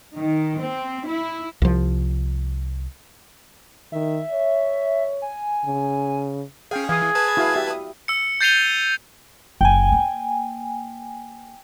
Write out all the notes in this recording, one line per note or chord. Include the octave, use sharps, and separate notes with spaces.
D#3
C4
E4
C2 F3
D#3 E5
C#5
G#5
C#3
C#4 G#4 F5 G5
E3 G#4 F5 D#6
B4 A5 G#6
E4 F#4 F5
G4 E5
D#6
E6 C#7
G6 A6 C7 D#7 F7 G7
F#1 G5 G#5
A#3